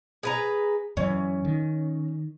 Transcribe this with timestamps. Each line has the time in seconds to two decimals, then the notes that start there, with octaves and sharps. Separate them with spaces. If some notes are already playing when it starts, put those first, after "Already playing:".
0.23 G#4 B4 A#5
0.97 F#2 E3 C#4
1.45 D#3